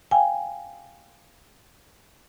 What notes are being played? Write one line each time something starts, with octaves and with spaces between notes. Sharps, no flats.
F5 G5 G#5